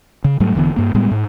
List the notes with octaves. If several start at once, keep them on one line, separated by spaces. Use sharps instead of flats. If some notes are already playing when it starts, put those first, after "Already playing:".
C#3
G#2 F#3 G3 A3
E1 D3 E3 B3
G2 A#3
A2 G3 G#3 B3
G#2